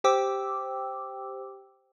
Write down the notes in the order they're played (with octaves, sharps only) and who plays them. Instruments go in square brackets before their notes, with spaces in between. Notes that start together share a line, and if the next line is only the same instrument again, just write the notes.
[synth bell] G4 C5 G5 D6 E6